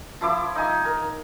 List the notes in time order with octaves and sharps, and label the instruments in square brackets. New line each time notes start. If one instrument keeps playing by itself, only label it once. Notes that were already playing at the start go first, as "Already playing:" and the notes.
[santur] F3 E4 D6 E6
D#4 G#5
A#4